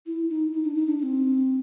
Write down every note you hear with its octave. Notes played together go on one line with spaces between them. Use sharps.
E4
D#4
D#4
D4
D#4
D4
D4
C4